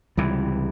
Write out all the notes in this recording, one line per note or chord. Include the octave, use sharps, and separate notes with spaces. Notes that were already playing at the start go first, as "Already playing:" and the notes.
C#2 C3 E3 G3